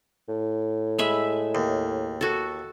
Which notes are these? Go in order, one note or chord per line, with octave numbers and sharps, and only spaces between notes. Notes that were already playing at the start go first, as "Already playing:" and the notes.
A2
G#3 E5 B5
D#2
F#4 A4